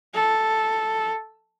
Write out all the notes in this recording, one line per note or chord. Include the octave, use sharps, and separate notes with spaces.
A4